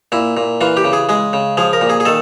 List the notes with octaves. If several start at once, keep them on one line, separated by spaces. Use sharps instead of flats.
A#2 E4
A#2
E3 F4
G4
C#3
G#4
G#3 G#4
C#3
F3 G#4
A#4
A#2
G#4
G#4
D#3 A4